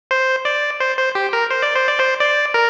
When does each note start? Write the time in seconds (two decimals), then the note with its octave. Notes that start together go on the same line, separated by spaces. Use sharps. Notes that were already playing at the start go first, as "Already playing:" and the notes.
0.11 C5
0.45 D5
0.80 C5
0.98 C5
1.15 G4
1.33 A#4
1.50 C5
1.63 D5
1.75 C5
1.87 D5
2.00 C5
2.20 D5
2.54 A#4